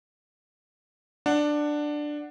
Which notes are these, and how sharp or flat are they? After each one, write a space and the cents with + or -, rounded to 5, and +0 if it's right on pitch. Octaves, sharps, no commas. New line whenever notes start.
D4 +10 F#5 +0